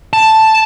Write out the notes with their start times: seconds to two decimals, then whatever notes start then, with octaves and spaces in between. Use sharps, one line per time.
0.13 A5